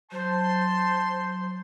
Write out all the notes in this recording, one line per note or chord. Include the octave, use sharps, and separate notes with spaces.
F#3 C5 A5 C6